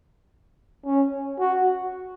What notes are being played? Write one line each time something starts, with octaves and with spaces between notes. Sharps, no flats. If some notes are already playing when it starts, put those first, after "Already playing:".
C#4
F#4